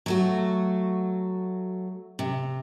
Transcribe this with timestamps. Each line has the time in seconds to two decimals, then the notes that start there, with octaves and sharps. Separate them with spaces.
0.06 F#3 A3 F#4
2.19 C3